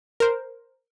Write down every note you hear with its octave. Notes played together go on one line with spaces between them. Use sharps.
A#4 C5